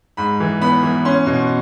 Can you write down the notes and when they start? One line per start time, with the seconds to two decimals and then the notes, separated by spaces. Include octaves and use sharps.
0.17 G#2 B5
0.40 E3
0.61 B3 B5
0.83 E3
1.05 C#4 C6
1.27 B2